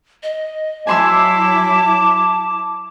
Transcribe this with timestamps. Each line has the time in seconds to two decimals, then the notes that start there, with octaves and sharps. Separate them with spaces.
0.23 D#5
0.87 F#3 E4 G#5 A5 C6 D6 E6